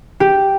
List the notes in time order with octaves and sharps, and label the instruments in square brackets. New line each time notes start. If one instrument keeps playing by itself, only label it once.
[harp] G4